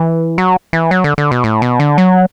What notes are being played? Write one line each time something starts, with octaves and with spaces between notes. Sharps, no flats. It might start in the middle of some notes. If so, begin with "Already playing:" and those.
Already playing: E3
F#3
E3
F#3
D3
D3
B2
A2
B2
D3
F#3